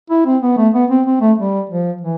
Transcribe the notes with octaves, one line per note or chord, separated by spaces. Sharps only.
E4
C4
B3
A3
B3
C4
C4
A3
G3
F3
E3